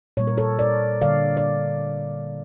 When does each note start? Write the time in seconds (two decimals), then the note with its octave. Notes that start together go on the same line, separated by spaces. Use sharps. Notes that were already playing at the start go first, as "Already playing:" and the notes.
0.17 A#2 G3 A#3 C#5
0.27 A#4
0.37 A4 C#5
0.59 A#4 D5
1.02 D3 G3 A#3 D5 F5
1.37 D5